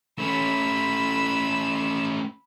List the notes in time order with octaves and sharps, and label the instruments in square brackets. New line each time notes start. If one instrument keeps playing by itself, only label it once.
[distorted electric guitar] A3 C#4 [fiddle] B5 E6